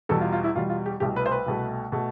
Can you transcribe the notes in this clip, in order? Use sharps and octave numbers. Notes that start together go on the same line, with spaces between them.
E2 B2 G3 A4
F4
F4
E4
E2 B2 G3 F4
F4
G4
C2 B2 A3 G4
B4
C5
B4
C2 B2 A3
B2 A3